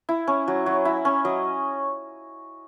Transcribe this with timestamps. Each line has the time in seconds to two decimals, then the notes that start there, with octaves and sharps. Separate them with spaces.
0.09 E4
0.27 C#4
0.48 F#3
0.66 F#3
0.85 E4
1.05 C#4
1.25 F#3 D#5